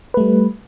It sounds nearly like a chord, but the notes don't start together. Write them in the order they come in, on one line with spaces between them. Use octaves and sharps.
B4 A3 G3